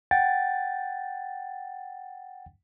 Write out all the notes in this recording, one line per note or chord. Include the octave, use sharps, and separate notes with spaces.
F#5 G5 A6